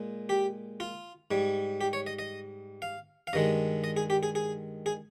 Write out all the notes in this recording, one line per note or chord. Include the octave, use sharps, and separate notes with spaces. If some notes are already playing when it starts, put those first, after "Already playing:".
Already playing: A#2 G#3
G4
F4
G#2 G3
G4
C#5
D#5
D#5
F5
F5
G2 D#3 G#3 D#5
D#5
G#4
G4
G#4
G#4
G#4